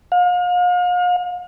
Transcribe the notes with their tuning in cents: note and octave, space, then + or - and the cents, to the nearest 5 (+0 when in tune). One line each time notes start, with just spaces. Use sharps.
F5 +40